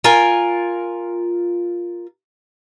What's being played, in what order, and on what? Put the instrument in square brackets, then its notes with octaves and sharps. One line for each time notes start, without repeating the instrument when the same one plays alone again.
[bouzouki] F4 A#4 G#5